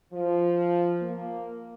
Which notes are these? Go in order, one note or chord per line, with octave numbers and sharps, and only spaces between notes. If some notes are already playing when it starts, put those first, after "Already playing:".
F3
A#3